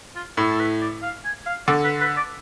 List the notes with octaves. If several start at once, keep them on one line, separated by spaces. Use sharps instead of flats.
F4
A2 A4
A4
B4
D5
F5
G#5
F5
D3 D5
B4
B4
D5